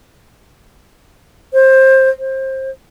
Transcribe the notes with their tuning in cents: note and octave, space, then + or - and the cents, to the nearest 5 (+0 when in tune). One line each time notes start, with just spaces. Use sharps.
C5 +20
C5 +25